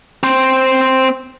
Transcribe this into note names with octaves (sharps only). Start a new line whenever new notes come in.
C4 C5